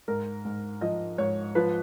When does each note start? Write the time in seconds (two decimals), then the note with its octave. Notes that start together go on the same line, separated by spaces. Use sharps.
0.08 G#2 A#4
0.45 G#2
0.81 F3 D#5
1.18 G#2 C#5
1.55 F3 B4